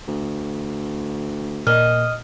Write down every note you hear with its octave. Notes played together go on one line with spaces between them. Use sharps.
D2
A#2 D#5 F6